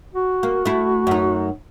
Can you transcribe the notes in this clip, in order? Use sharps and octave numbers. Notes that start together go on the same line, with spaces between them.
F#4
A#3
A3 E4
F#2 D#4